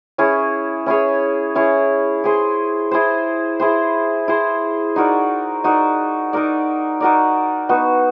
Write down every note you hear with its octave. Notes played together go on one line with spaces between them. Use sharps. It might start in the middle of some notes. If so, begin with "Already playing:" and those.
C#4 E4 G#4 C#5
C#4 E4 G#4 C#5
C#4 E4 G#4 C#5
E4 G#4 C5
E4 G#4 C5
E4 G#4 C5
E4 G#4 C5
D#4 F#4 A#4 D5
D#4 F#4 A#4 D5
D#4 F#4 A#4 D5
D#4 F#4 A#4 D5
B3 D#4 F#4